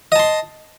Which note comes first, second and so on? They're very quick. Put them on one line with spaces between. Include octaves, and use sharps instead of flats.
D#5 A5 C6